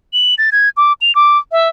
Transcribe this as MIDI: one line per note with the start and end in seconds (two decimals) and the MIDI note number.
0.13 0.35 102
0.38 0.50 93
0.52 0.69 92
0.77 0.93 86
1.01 1.14 101
1.15 1.38 86
1.52 1.68 76